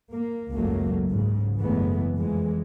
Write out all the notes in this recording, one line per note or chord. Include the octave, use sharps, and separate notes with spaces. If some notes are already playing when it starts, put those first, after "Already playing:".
A#3
G#1 C#2 F#2 F#3 A3 A#3
G#2 C#3
F#1 E3 G#3 A3 B3
F2 E3 G#3